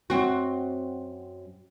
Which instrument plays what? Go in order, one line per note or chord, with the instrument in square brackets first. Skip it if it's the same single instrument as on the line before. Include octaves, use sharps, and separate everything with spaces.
[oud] F#2 C4 F#4